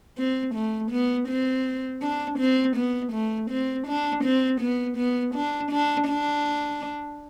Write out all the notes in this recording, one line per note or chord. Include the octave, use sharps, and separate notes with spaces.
C4
A3
B3
C4
D4
C4
B3
A3
C4
D4
C4
B3
B3
D4
D4
D4